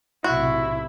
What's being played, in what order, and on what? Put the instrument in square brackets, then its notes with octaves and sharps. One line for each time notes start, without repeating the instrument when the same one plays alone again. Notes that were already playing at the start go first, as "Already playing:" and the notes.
[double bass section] B1 A2 C3 [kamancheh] E4 [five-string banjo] F#4